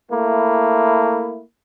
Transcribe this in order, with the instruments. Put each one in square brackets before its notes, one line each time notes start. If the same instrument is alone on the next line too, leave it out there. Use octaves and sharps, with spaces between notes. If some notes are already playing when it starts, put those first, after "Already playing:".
[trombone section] A3 A#3 E4